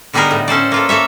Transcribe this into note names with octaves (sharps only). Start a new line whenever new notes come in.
D3 G3 B3 D#4 G#4 A#4
A2
C#4 A4 C5 D5
A#3 F4 A4
A#3 A4 C#5 E5